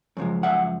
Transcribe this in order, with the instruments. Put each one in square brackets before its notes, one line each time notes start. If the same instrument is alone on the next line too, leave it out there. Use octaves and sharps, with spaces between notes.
[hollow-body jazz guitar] F#2 C#3 F3 G#3
E5 F#5